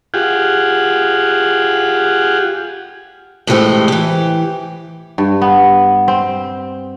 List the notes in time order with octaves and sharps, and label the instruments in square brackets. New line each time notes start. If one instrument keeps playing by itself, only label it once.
[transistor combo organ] F4 G4 G#4 F#5
[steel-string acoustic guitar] A2 E3 G#3 A3 G4 C5
E3 G4
[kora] G2
B3
C4